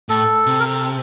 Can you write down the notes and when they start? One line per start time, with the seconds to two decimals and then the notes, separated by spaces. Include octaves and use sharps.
0.09 A2 A4
0.46 C3
0.59 A#4
0.65 A4